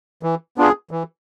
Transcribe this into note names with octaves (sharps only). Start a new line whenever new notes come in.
E3
B3 D4 F4 G#4
E3